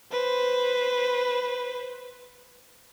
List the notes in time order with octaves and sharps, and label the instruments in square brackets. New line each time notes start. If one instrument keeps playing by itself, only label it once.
[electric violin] B4 C5